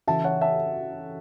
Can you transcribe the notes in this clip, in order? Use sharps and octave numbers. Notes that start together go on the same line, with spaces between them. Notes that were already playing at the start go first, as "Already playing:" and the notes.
C#3 E3 C#4 F#4 A4 E5 A5
C#5 F#5
E5 A5